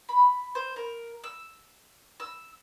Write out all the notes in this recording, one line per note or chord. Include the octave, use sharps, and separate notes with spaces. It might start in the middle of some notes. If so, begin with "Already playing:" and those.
B5
C5
A#4
E6
E6